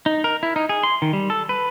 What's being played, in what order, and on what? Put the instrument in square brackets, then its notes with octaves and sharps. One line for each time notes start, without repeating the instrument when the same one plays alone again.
[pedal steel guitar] D#4
A#4
E4
D#4
G#4
C6
D#3
G3
A4
B4